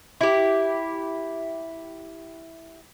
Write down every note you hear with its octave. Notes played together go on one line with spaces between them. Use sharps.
E4 G4